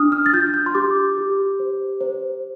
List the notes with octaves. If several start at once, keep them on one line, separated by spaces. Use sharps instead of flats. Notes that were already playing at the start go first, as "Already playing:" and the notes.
Already playing: D4 D#6 F6
F6
A6
F4 G6
G6
C6
G4 D6
G4
C5
C5